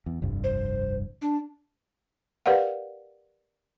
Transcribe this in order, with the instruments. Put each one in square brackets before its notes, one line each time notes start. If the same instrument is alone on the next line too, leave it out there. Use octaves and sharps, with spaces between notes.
[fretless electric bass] E2
F1 C2 G2
[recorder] C5
D4
[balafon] G4 A#4 B4 D5 F5 F#5